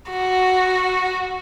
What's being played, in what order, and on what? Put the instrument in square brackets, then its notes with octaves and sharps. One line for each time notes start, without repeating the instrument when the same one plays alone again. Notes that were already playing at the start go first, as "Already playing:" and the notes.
[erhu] F#4